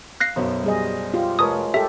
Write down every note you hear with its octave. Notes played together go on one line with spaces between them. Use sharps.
F5 F#6 A#6 C7
B1 F#2 F#3 B3 C5
G3 G#4 D#5
F4 G4
F1 G#3 A#4 B4 C#5 A5 D#6
G4 A4 A#4 E5